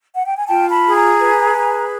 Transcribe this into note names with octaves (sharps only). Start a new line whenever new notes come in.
F#5
G5
G#5
F4 G5 A5
A5 B5
G#4
G#5 A#5
B4
G#4